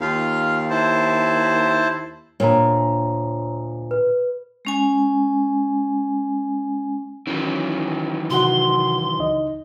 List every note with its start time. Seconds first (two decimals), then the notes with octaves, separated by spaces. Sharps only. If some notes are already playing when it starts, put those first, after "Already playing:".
0.01 D#2 F4 F5
0.70 E4 C5 A5
2.40 D2 A#2 C#5 A#5
3.91 B4
4.65 G#3 C#4 G#5
7.27 D#3 E3 F#3 C#4
8.30 C3 F#4 F#5 C6
9.19 C#2 D#4 D#5